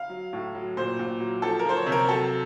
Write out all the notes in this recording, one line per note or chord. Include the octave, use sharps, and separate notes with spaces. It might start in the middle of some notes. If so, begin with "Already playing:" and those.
Already playing: F5
F#3
A2
F#3
A#2 C5
A#2
F#3
F3 A4
A#4
F3 C5
C#5
C3
A#4
F#3 A4